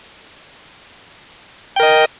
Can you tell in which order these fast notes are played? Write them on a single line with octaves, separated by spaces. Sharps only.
G5 A#4 D#5